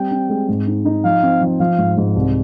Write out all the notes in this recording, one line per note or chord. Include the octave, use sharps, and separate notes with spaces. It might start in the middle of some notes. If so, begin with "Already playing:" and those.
Already playing: G3 C4 G5
C4
G#3
G#2
D#4
D#4
F3 F5
C4
F3
F3 F5
G#2
G#2
C2